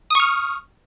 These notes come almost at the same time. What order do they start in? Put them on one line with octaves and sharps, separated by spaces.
D#6 C#6 F6